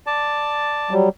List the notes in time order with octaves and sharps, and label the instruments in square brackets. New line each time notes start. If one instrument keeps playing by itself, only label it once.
[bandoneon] D5 A5
[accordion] F#3 G3